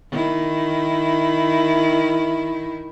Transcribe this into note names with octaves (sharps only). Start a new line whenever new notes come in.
D#3 E4